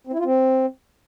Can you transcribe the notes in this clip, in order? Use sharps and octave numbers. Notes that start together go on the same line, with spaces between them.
C4
E4
F4
C4